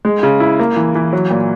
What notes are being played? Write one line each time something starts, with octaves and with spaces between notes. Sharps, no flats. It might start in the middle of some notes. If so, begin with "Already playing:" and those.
G#3
C#3
E4
A#3
E3
E3
F#3
A#2